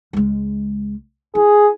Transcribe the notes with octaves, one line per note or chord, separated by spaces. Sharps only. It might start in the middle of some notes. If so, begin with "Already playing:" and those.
C#2 G#3
E4 G#4